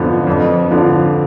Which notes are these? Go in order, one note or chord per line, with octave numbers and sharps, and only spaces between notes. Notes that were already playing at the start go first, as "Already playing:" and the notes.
Already playing: F2 D3 F3 B3
F2
D3 F3